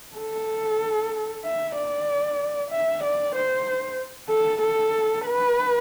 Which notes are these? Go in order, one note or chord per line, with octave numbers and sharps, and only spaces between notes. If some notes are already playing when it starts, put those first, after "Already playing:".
A4
E5
D5
E5
D5
C5
A4
A4
B4